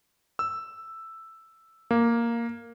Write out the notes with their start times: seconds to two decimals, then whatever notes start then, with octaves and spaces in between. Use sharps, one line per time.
0.39 E6
1.91 A#3